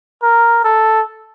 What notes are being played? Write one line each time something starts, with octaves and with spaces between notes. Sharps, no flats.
A#4
A4